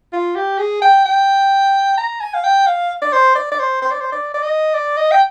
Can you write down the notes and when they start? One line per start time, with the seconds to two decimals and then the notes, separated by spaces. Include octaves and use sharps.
0.13 F4
0.36 G4
0.58 G#4
0.82 G5
1.05 G5
1.97 A#5
2.20 G#5
2.34 F5
2.44 G5
2.66 F5
3.02 D5
3.12 C5
3.35 D5
3.51 D5
3.59 C5
3.82 C5
3.91 D5
4.01 C5
4.12 D5
4.34 D5
4.43 D#5
4.74 D5
4.97 D#5
5.11 G5